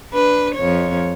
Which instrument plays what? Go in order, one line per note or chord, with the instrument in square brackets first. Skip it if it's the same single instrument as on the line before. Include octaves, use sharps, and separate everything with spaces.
[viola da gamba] D4 B4
F2 C#5